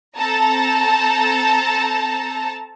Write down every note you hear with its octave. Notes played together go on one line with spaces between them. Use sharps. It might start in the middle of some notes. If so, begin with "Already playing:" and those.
C4 A4 A5 A#5